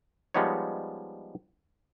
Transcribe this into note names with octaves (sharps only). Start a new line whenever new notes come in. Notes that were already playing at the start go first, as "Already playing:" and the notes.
F3 G3 G#3 B3 D#4 C#5